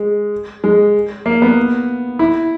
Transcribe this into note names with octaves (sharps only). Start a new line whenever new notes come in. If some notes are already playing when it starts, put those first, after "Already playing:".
Already playing: G#3
G#3
A#3
B3
E4